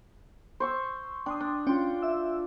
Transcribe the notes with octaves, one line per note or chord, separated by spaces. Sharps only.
C5 C#6 E6
D4 G5 C6 D#6
D4
C#4 F4 G5
E5 E6